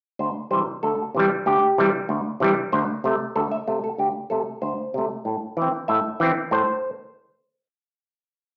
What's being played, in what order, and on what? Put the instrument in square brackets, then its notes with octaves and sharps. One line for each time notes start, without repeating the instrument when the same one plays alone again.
[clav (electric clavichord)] D2 C5
C3 E3 G3 C5
D2 A4
C3 E3 G3
D2 G4
C3 E3 G3
D2
C3 E3 G3
D2 C5
C3 A3
D2 A4
E5
C3 A3
A4
D2 G4
C3 A3 A4
D2 C5
C3 A3
A2
E3 C4
A2 E5
E3 C4
A2 C5